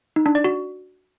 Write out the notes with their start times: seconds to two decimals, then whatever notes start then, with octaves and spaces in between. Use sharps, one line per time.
0.16 D#4
0.26 D4
0.35 D5
0.44 F#4